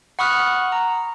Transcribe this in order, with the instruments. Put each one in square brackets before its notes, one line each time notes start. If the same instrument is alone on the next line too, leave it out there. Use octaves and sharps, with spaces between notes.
[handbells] F#5 B5 C#6 D#6 F6 F#6
A#5